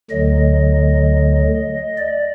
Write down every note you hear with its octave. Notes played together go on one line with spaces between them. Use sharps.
D2 D3 F#3 D#5
D5